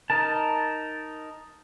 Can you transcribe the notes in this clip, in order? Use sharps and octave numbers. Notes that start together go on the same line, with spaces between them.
D#4 A#4 A5